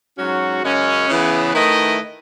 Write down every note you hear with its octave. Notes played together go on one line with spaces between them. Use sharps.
G#2 F#3 C#4 F#4
F#2 C#3 G#3 C#4
C#3 E3 B3
D#3 A3 E4 B4 D#5